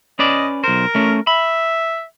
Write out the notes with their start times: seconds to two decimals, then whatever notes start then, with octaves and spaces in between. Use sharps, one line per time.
0.19 C#4 B4 D5 D#5
0.64 B1 A#4 C5
0.95 A3 C#4
1.27 E5 B5